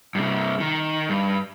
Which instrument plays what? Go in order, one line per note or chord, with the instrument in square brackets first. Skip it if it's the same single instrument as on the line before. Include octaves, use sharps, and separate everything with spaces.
[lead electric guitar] G2 C3
D#3
G2